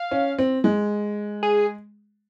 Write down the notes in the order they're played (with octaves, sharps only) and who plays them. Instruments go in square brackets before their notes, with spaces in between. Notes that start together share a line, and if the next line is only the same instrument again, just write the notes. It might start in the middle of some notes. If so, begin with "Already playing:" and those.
Already playing: [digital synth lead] F5
[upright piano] C#4
C4
G#3
[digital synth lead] G#4